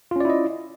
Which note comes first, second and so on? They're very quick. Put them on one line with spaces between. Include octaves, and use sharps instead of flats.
F4 C#4 D5 E4 D#5